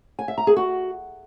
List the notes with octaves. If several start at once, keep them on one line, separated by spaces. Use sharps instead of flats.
G#5
E5
A#5
G#4
F#4